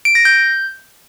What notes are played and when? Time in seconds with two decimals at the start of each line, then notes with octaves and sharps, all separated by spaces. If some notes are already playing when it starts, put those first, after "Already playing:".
0.05 D7
0.15 A#6
0.25 G6